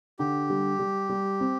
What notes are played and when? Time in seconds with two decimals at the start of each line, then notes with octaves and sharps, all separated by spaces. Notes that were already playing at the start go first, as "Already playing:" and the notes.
0.19 D3 G4
0.50 G3
0.79 G3
1.09 G3
1.40 C4